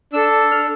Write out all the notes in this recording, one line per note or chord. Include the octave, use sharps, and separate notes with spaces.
D4 A4 E6
F6